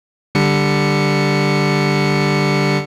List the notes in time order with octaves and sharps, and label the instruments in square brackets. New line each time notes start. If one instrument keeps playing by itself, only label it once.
[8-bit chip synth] D3 G3 C#7